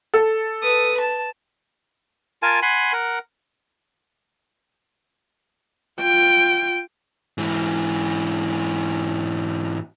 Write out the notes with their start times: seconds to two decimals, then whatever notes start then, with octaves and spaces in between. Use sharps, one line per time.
0.14 A4
0.63 B4 D#6
1.00 A5
2.42 F4 A#4 G#5 A5
2.62 F#5 G#5 B5 C6
2.93 A#4 F#5
6.01 F4 G5
7.38 G#2 E3